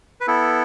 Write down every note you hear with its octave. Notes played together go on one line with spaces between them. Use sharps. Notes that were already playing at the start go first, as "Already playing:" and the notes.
B4
B3 E4 A4